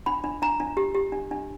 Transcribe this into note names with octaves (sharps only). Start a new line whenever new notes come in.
D4 B5
D4
D4 A#5
D4
G4
G4
D4
D4